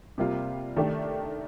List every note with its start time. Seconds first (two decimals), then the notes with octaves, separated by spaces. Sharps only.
0.18 C3 G3 A#3 F4
0.76 D#3 A3 D4 G4